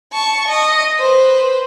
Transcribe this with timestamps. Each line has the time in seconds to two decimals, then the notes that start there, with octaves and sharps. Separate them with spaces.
0.13 A5 C#6
0.48 D#5
0.99 B4 C5